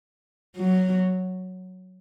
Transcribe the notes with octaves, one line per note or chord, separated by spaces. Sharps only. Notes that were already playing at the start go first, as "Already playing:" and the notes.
F#3